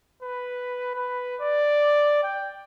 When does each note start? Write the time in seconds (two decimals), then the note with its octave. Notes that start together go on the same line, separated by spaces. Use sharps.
0.23 B4
0.95 B4
1.41 D5
2.23 G5